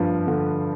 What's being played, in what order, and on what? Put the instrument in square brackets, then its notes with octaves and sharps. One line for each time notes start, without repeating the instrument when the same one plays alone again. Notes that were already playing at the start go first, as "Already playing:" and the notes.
Already playing: [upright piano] G2 F3
D3